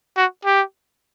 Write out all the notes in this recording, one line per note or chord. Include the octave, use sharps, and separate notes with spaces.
F#4
G4